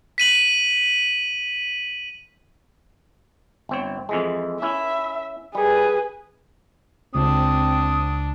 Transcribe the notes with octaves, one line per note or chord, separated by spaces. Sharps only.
B6 D#7 F#7
G1 C4 C#5
F2 E3 G#3
C#4 E4 E5
G3 G#4 B4
C#2 C4 D4 D#6